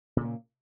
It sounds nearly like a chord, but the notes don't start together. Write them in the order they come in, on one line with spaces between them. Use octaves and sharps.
A#2 C#3 A#3